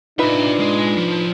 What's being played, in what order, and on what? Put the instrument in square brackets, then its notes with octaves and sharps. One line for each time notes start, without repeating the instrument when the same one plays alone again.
[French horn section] D4 [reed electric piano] D#4 B4 B5 [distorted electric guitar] F4 D5 [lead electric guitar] C5 E5
[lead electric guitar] G#3
F3